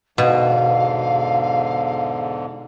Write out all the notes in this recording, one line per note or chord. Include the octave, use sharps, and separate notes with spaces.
E2 G#2 B2 D3 F5